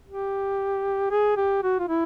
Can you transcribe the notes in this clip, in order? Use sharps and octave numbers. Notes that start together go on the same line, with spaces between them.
G4
G#4
G4
F#4
F4
E4